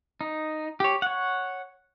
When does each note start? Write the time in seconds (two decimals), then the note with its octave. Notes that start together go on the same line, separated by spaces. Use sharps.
0.21 D#4
0.80 G4 C#5
1.02 C#5 F#5